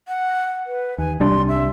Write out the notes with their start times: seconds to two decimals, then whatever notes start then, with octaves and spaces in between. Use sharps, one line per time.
0.08 F#5
0.67 B4
0.98 D#2 G#5
1.20 C2 G3 D4 C6
1.48 E5